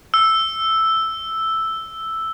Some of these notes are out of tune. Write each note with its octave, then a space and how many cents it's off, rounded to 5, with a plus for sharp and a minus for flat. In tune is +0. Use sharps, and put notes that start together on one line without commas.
E6 +0